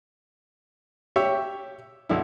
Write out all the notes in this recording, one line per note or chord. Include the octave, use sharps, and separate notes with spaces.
G4 C#5 E5
B1 E4